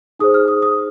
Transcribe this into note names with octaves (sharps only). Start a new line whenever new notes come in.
D#4 G#4 C5 D#6
F6
D#6
D#6